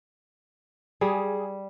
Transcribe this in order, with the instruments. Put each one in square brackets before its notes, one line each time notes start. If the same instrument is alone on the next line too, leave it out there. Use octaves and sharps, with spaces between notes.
[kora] G3 [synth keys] G#4